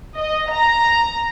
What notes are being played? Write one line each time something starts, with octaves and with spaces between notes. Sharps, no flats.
D#5
A#5